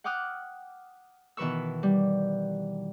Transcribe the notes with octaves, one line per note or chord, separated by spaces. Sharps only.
F#5 G5 D6 D#6 F6 F#6
B2 D#3 E3 B4 C#6 E6
G3